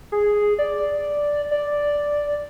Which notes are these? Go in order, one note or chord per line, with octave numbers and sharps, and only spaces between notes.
G#4
D5
D5